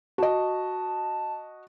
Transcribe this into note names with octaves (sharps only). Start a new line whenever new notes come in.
F#4 D#5 A5